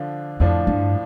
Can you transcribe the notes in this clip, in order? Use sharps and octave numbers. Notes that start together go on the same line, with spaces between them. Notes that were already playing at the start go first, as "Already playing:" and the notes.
Already playing: D3 F3 D4 F4
F2 A2 F3 D4 F4
G2